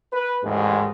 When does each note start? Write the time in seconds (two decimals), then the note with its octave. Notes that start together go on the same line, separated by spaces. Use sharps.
0.13 B4
0.44 A1 D#2 G#2